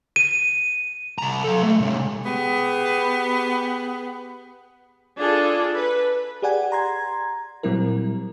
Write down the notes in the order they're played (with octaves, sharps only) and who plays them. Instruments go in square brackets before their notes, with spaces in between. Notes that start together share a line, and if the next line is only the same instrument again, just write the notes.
[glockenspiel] D#7
[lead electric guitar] C2 A#5
F#3 A4
A3 A#3
C3 G#3
[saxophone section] B3 G4 G#4
[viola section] D4 F4 G#4 A4
B4
[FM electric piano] G4 G#4 D5 F#5 G#5
A#5 C6 G#6
A#2 F#3 G3 C4 E4 A#4